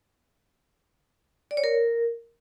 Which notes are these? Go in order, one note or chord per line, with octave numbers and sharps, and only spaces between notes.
D5
C#5
A#4